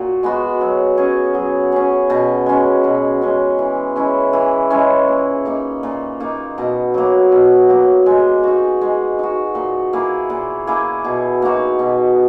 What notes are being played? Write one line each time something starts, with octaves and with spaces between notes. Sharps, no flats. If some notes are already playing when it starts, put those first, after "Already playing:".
Already playing: A#2 F#4
G#3 B3 F#4
F#3
C#4 G#4
F#3
C#4 G#4
B2
G#3 C#4
B2
G#3 C#4
E3
G#3 C#4 E4
E3
G#3 C#4 E4
A#2
A#3 D#4
A#2
A#3 D#4
B2
F#3 A#3
B2
F#3 A#3
G#3
D#4 F#4
G#3
D#4 F#4
A#2
A#3 E4 G#4
A#2
A#3 E4 G#4
B2
A#3 D#4 F#4
B2